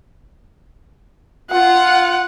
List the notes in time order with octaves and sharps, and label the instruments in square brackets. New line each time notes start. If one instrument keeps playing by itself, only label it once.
[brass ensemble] F4 [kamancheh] F#5